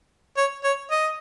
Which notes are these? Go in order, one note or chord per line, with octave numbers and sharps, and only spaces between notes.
C#5
C#5
D#5